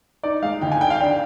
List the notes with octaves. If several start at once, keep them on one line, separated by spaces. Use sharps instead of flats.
D#4 D5
G#3 F5
D2 G5
G#5
D3 G5
F5
D4 G5